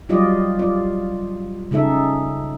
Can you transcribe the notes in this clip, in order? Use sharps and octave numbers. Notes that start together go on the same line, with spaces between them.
F#3 G3 F4 G4 D5 D#5
F4 D5
C#3 G#3 D#4 A4 E5